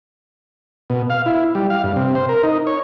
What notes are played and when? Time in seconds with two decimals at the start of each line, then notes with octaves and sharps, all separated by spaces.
0.90 B2
1.10 F5
1.26 E4
1.55 G3
1.70 F5
1.83 G2
1.96 C3
2.15 C5
2.29 A#4
2.43 D#4
2.67 C#5